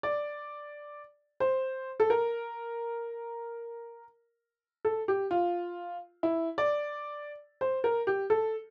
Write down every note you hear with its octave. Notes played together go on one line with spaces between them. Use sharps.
D5
C5
A4
A#4
A4
G4
F4
E4
D5
C5
A#4
G4
A4